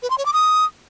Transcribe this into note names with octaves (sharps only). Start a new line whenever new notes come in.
B4
C6
C#5
D6
D#6